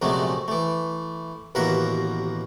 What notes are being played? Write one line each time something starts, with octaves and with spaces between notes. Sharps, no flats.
A#1 F#2 C3 F#3 G#3 A3
E3 A3
A1 D#2 B2 A#4 E5 F#5